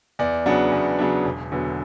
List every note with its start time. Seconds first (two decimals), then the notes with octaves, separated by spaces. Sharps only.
0.19 E2 D5
0.46 C#3 F#3 B3 D4 F#5
0.72 E2
0.98 C#3 F#3 B3 D4
1.24 E1
1.52 E2 D3 F#3 B3